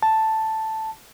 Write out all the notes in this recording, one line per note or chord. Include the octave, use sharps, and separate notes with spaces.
A5